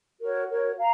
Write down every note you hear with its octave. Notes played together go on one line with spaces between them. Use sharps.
F#4 A#4 C#5
F#4 A#4 C#5
F5 A#5